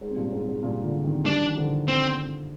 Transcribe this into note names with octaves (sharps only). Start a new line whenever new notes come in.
G#2
C3
G2 A#2
G#2 C3
G#2 C3
G2 A#2
A#2 D3
C3 D#3
G3 D4
F3
D#3
D3 F3
C4